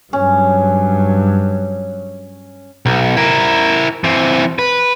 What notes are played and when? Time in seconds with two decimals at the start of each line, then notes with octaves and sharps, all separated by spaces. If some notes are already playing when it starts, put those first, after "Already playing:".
0.13 G2 F#3 C#4
2.86 B1
3.16 E4 A#4
4.04 E3 C4
4.59 B4